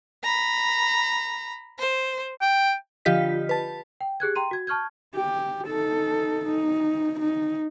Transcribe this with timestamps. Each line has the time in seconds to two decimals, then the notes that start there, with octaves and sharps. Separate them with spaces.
0.23 A#5 B5
1.78 C5
2.41 G5
3.05 D3 F3 F4 G4 D#5 B6
3.49 B4 A5
4.01 G5
4.20 G4 G#4 F#6 G#6
4.36 G5 A#5 C6 D#7
4.51 F#4 G#6
4.67 A5 C#6 F6 G6 G#6
5.16 G4
5.68 D#4 A4
6.45 D#4
7.20 D#4